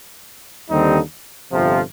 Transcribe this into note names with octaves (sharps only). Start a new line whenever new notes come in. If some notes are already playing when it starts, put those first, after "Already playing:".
D#2 D3 G3 C4 D#4
G1 F2 C3 F3